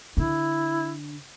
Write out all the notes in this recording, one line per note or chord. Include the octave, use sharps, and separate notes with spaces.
D3 D4 E4